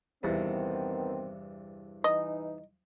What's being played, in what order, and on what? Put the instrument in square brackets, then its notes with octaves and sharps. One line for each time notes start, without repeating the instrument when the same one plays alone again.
[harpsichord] E2 G2 C3 [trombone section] D#3 B3 C4
[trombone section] E3 D#4 [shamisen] D#5